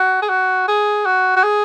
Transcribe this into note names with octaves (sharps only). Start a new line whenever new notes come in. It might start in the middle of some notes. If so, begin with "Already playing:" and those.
Already playing: F#4
G#4
F#4
G#4
F#4
F#4
G#4